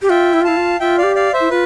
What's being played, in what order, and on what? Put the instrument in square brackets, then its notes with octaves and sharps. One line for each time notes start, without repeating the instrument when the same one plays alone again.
[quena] G4
[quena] F4 [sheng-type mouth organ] E5 G5
[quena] E4
F4
[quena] E4 [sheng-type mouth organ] F5 A5
[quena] F4
[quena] F4 [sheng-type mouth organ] E5 G5
[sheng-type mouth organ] D5 F5
[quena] G4
[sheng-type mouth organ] D5 F5
C5 E5
[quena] E4
[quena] F4 [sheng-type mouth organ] B4